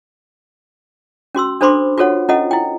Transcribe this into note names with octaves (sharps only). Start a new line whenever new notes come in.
C#4 F#4 C6 E6
D4 A4 C5 B5 C6 D6
F4 F#4 A4 C#5 F#5
C#4 E4 F4 A4 D#5 F#5
E4 G5